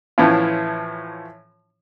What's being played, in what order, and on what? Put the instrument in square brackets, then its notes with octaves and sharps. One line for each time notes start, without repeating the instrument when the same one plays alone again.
[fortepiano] A2 E3 F3 C#4 E4 F4